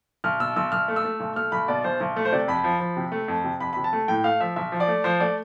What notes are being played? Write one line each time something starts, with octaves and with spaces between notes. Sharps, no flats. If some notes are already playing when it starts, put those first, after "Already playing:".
B1 F6
B2 E6
B1 E6
B1 F6
A3
E6
A3
B1
A3 F6
B1 B5
B2 D5
B1 C5
B1
A3
C5
C3 D5
F2 B5
F3
F3
C3
A3
F2
C3
F2 B5
C3 B5
A5
A3
A2 G5
A3 F5
F3 E5
B1 E5
F3
D5
A3
F3 C5
A3 D5